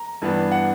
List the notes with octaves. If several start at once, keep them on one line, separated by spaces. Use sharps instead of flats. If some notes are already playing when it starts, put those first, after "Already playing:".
Already playing: A#5
G2 E3 B3 D4
F#5